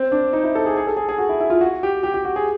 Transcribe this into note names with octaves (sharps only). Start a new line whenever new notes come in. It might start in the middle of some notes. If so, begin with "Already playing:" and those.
Already playing: C4
D4
D#4
E4
A4
G#4
G#4
A4
G#4
G#4
F#4
E4
E4
F4
F#4
G4
G4
G4
F#4
G#4